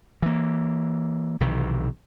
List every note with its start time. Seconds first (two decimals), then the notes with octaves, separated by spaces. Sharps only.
0.22 E3 A#3
1.40 B1 C3 D#3 E3